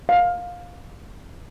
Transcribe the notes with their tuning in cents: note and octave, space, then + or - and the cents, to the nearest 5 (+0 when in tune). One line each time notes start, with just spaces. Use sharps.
F5 +20